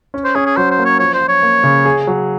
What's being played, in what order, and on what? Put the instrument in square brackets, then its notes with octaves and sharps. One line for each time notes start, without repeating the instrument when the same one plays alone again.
[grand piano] C#4
[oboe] C5
[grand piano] C#4 [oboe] G#4
[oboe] G#4
[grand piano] F#3 [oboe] C5
[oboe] C5
[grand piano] A#3
[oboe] C#5
[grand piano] F3 [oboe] C#5
[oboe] C5
[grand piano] F3
[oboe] C#5
[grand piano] A#3
C#3
G#4
F#3